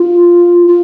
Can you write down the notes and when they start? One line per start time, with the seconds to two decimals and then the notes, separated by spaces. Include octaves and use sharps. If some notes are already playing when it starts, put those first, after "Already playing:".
Already playing: F4
0.68 F4